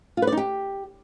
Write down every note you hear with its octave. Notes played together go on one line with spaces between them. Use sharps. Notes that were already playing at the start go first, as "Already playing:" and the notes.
F4
B4
D5
D#4
G4